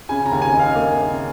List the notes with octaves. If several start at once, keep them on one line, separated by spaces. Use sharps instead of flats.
C#3 G#5
A#5
D#2
G#5
D#4
F5
A#3
C#3